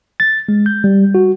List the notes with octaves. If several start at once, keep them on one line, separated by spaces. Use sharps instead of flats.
A6
G#3
G6
G3
F#4